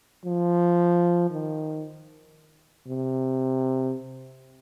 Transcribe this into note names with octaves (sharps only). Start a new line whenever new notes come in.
F3
D#3
C3